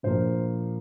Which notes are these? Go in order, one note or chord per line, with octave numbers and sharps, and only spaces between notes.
A#1 A#2 F3 A#3 C5